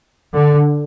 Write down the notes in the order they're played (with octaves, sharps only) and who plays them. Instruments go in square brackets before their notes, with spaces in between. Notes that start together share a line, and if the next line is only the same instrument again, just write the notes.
[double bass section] D3